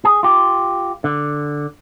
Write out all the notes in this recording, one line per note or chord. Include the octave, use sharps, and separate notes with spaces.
G#4
F4 G4
D3